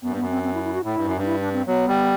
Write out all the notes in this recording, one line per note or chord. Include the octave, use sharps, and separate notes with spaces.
F#2 B3
G2
B3
F#2
C4
C4
E4
E4
F#4
A2 E4
G2
F#2
G2
D4
E4
D4
C4
F#3 B3
G3